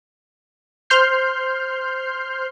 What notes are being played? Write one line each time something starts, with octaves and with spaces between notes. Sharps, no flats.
C5 C6 F6 G6 C7